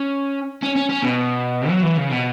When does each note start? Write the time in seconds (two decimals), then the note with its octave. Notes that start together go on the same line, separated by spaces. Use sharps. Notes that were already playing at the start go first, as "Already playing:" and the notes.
Already playing: C#4
0.62 C#4
0.76 C#4
0.89 C#4
1.03 B2
1.69 F#3
1.83 E3
1.97 C#3
2.11 B2